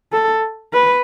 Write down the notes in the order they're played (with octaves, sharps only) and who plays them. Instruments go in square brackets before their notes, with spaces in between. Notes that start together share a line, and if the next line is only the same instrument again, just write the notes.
[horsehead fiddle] A4
B4